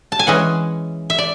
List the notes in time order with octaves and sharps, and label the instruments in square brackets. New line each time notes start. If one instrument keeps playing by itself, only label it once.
[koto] A5
G#5
E3 G#3 C#4 F#5
E5
D5